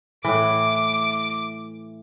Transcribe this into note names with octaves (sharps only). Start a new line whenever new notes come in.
A2 E3 D6